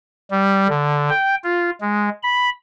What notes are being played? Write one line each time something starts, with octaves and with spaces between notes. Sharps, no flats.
G3
D3
G5
F4
G#3
B5